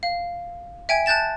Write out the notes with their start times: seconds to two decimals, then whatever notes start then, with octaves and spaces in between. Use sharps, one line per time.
0.03 F5
0.89 E5 G5 G#5 G#6
1.06 A5 F#6 G6 A6 E7